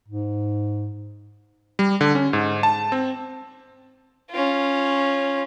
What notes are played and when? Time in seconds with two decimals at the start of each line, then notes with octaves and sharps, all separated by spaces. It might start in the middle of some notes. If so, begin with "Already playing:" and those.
0.08 G#2
1.79 G3
2.01 D3
2.15 C#4
2.33 G#2
2.63 A5
2.92 C4
4.30 C#4 F4